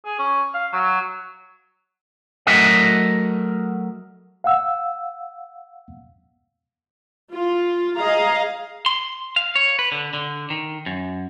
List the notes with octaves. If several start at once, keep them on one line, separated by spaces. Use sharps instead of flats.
G#4
C#4
F5
F#3
F#3 A3 A#4 D#5 E5 F#5
F5 F#5 E6
F4
G#4 D#5 F5 A#5
C6
F5
C#5
B4
D3
D3
D#3
F#2